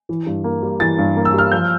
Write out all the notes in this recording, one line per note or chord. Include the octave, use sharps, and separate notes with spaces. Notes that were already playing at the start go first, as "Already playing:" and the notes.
E3
G2
A#3
G3
E3 A6
G2
A#3
E6
G3 F6
F3 G6